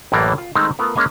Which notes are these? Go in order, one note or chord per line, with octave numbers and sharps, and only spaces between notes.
A1 F#2 A2 E3 A#3 D5
F4
D#3 G#3 A3 C4 D#4
A3 B3 F4 A#4
G#3 A#3 C#4 D#5 F5 G#5